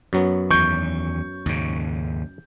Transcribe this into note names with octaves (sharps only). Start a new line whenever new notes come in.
F#2 F#3 B3
E2 D#3 C#6 G6
D#2 G#2 C#3